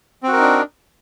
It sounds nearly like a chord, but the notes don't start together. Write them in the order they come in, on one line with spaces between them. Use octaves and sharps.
C4 F#4 A#4 D#4 D4